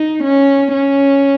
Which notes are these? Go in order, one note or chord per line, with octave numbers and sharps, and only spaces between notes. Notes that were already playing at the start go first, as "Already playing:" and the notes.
Already playing: D#4
C#4
C#4